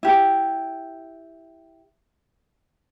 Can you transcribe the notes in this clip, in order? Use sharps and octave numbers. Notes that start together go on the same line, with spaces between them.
E4 G4